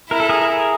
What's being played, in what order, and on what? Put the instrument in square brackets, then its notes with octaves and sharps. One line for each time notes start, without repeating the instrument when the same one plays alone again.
[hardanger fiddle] E4 [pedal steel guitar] A#4
[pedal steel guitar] A4
G#4 A#4
G#4 A#4